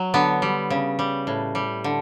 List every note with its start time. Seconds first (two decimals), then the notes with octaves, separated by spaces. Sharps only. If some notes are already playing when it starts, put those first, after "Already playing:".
Already playing: F#3
0.14 D3 B3
0.42 G3
0.70 C#3
0.99 G3
1.27 A2
1.55 G3
1.84 D3